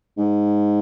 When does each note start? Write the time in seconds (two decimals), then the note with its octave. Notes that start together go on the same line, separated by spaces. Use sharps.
0.17 G#2